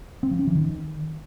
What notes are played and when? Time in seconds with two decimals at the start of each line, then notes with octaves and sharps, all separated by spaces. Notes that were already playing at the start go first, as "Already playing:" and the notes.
0.23 C4
0.31 F3
0.39 C#4
0.47 E3
0.55 D#3